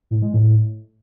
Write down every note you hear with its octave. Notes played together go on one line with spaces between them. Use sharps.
A2
G#3
A2